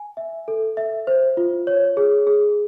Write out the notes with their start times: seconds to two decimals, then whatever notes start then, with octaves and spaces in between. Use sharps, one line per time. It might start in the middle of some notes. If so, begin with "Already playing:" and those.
Already playing: G#5
0.17 E5
0.48 A4
0.77 E5
1.07 C5
1.37 F4
1.67 C#5
1.97 G#4
2.27 G#4